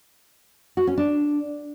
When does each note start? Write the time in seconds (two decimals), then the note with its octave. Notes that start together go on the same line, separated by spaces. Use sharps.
0.77 F#4
0.87 C#4
0.98 D4